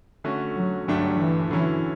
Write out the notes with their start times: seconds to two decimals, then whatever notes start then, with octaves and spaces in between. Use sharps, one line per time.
0.24 D3 A3 C#4 F#4
0.56 F#3
0.87 G2 D3 F#3 A3 D4 G4
1.19 E3
1.51 D3 E3 F#3 C#4 E4